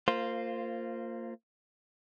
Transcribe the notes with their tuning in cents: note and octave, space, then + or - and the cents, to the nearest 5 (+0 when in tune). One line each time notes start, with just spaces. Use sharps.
A#3 -25 F4 +0 C5 +0